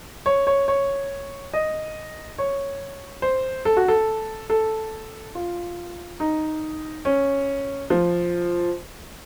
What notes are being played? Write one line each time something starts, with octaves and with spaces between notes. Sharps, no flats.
C#5
C#5
C#5
D#5
C#5
C5
A4
F#4
A4
A4
F4
D#4
C#4
F3